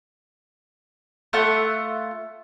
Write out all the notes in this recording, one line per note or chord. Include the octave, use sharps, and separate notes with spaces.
A3 F4 E5 F#5